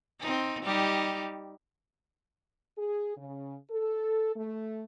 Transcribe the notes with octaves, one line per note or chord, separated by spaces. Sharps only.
C4 D#4
G3 D#4 G4
G#4
C#3
A4
A3